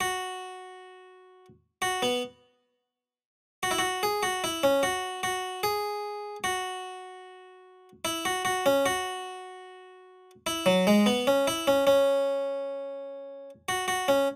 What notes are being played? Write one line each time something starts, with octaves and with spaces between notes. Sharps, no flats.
F#4
F#4
B3
F#4
E4
F#4
G#4
F#4
E4
C#4
F#4
F#4
G#4
F#4
E4
F#4
F#4
C#4
F#4
E4
F#3
G#3
B3
C#4
E4
C#4
C#4
F#4
F#4
C#4